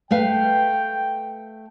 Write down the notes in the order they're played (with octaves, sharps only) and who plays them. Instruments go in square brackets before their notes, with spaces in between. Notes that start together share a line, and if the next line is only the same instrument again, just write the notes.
[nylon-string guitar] A3 B4 F5 [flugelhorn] G5